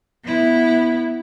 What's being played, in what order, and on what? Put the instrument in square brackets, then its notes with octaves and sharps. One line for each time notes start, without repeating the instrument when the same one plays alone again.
[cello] B3 E4